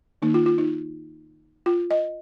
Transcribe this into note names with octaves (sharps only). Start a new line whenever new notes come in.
D#3 A#3 D#4
F4
F4
D#4
F4
D#5